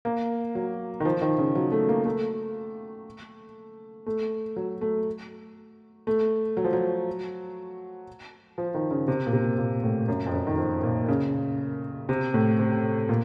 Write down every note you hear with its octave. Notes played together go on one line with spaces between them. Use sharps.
A#3
F#3
D#3
F3
D#3
C#3
F#3
A3
A#3
A3
A3
F#3
A3
A3
F#3
F3
F#3
F3
D#3
C#3
C3
A#2
C3
A#2
A2
F#2
F2
F#2
D#3
F3
A#2
C#3
C3
A2
C3
A#2